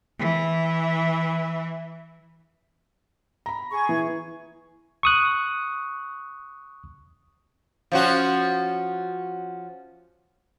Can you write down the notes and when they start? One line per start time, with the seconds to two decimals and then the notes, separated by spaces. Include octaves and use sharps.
0.19 E3 E5
3.46 A#5 B5
3.70 G#4 C#6
3.89 E3
5.03 C#6 D#6 F#6
7.92 F3 C#4 F#4